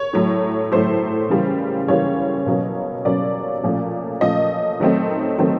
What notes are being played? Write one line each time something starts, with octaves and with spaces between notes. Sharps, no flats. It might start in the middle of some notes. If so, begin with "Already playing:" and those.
Already playing: C#5
A2 F#3 A3
A2 F#3 A3 C5
C#3 E3 G3 A#3
C#3 E3 G3 A#3 C#5
B2 F#3 A#3 C#4
B2 F#3 A#3 C#4 D5
A#2 F3 A3 C#4
A#2 F3 A3 C#4 D#5
D#3 F#3 A3 C4
D#3 F#3 A3 C4